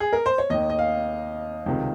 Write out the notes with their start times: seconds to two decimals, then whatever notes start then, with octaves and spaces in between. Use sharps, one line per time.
0.00 G#4
0.13 A#4
0.26 C5
0.38 C#5
0.50 D#2 D#3 D#5
0.70 D#5
0.79 F5
1.66 C#2 C3 D#3